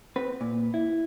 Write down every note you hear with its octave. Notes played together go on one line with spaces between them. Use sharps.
C4 B4
A#2
E4